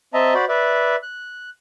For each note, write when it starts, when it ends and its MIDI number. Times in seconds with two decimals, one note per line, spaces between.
0.14 0.34 60
0.14 0.34 75
0.14 0.34 76
0.14 0.34 81
0.14 0.34 82
0.34 0.45 66
0.34 0.45 72
0.34 0.45 74
0.34 0.45 83
0.49 0.96 71
0.49 0.96 74
0.49 0.96 76
1.03 1.50 90